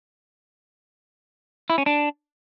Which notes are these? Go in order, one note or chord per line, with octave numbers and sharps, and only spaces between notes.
E4
C#4
D4